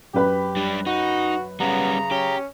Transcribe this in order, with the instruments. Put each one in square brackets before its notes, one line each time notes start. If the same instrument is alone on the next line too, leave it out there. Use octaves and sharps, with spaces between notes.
[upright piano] F#2 B4 B5 [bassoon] G4
[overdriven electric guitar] G3 D4
[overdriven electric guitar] D#4 [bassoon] F#4
[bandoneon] C#3 A#5 [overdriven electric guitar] G3 C#4 [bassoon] B3
[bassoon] C#4 [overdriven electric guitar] G4